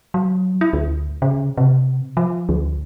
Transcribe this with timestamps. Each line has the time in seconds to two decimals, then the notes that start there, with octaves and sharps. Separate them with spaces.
0.14 F#3
0.61 E4
0.73 D2
1.22 C#3
1.57 C3
2.17 F3
2.49 D2